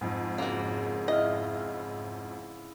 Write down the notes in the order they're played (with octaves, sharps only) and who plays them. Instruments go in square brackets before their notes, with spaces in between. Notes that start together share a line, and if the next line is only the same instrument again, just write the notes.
[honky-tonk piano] F2 G#2
[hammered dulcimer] C#3 [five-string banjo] A#3 F#4
[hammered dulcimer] E4 F5 [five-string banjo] D#5